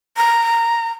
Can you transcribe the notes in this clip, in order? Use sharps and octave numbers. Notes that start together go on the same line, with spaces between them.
A#5